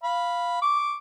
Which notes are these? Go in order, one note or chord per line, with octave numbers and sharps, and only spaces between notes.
F5 B5
C#6 D6